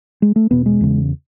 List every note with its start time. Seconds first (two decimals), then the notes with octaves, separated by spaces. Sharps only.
0.22 G#3
0.36 A3
0.50 E2 B2 B3
0.66 G#3
0.81 E2 C#3